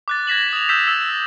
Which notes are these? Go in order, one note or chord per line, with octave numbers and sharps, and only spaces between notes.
D6 F#6 A6
G#6 A#6 B6 E7 F#7
D#6 F7
E6 G6 B6 E7
E6 A6